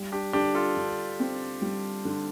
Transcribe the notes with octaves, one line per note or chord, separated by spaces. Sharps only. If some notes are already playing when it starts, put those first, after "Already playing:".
Already playing: G3
D4 G4
D3 D4 G4
F4 A4
D3
C4
G3
D3